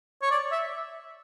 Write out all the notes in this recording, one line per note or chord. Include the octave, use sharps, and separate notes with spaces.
C#5
D5
E5